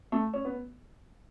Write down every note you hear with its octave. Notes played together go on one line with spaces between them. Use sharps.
A3
C#4
B3